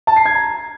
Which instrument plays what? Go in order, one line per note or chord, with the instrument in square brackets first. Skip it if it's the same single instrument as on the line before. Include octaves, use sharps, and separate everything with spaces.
[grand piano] A5
C7
G#6
A#5